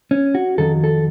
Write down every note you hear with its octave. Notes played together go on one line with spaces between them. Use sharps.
C#4
F#4
F2 D#3 F#3 A4
A4